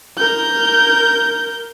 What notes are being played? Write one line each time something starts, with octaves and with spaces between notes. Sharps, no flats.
A#4 G6